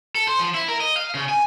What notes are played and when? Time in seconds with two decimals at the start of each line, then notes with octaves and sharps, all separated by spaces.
0.15 A4
0.27 C5
0.40 F3
0.54 E4
0.68 A#4
0.80 D#5
0.96 F5
1.15 C#3
1.29 G#5